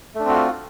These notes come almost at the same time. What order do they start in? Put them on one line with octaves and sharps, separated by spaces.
A3 D4 C4 F#4 F4